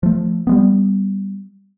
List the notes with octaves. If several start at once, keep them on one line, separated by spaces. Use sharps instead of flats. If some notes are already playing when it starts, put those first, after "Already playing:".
F3 A3
G3 G#3 B3